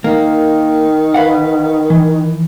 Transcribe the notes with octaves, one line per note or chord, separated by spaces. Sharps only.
D#3 A#3
B4 F5 F#5
E3